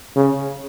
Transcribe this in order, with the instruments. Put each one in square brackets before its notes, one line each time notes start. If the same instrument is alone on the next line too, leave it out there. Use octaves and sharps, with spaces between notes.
[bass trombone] C#3